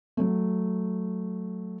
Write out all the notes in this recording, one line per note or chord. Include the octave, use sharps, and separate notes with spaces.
F#3 A3